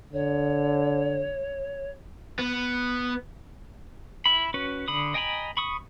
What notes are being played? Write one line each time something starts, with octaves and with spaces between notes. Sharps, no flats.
D3 C#5
B3
E4 B5
C#4 F#4 B4
D3 B5 D#6
D#5 G5 G#5 A#5 B5
B5 C#6 D#6